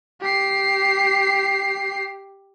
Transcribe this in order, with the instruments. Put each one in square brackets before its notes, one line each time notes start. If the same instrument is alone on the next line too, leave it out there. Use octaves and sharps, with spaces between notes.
[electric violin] G4 C7